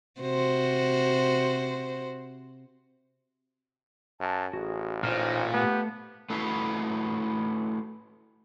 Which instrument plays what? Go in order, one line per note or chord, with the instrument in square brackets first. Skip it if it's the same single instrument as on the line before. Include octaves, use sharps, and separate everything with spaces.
[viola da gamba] C3 F#4 C5
[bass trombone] F#2 [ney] A5
[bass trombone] A1 [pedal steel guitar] F#4 [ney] G#4
[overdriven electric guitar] A#2 [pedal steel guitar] D#4 F6 [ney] C5
[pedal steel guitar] A3 [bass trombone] B3 [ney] G4
[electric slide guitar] A3 E4 F#4 B4 F5